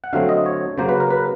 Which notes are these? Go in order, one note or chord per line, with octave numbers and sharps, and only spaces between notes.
F#5
D3 F#3 A3 C4 F5
D#5
C#5
C#3 F#3 A#3 C5
B4
A#4
B4